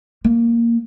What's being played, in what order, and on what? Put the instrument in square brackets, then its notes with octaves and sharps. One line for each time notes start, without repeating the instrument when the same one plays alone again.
[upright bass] A#3